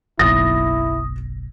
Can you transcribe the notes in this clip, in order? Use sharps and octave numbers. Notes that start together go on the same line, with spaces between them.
F#1 B1 E4 D#6 A6 A#6